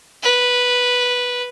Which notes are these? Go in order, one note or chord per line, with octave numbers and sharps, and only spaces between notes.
B4